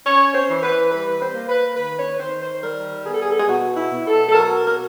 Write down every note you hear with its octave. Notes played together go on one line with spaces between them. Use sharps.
C#4 C#5
C5
E3
B4
G3 B4
C5
A#3
B4
D#3 B4
C#5
B4
D#3 C5
C5
G3 A#4
B3 G#4
A4
G#4
A4
G#4
B2 F#4
E4
B2
A4
A4
F#3 A#4
A#4